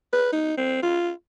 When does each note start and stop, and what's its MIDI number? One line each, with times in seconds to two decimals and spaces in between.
0.13 0.29 71
0.33 0.57 63
0.57 0.82 60
0.83 1.10 65